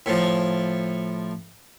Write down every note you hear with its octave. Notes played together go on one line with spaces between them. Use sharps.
A2 F3